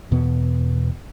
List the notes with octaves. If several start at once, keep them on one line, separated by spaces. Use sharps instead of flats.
E2 B2 B3